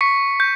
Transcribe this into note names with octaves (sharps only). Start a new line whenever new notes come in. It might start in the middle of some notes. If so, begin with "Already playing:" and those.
C#6 B6 C#7
G6